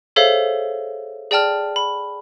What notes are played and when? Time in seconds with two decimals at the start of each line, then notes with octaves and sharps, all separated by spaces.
0.16 G#4 A4 C5 C#5 E5 F5
1.31 G#4 D5 G5 A5 F6
1.76 B5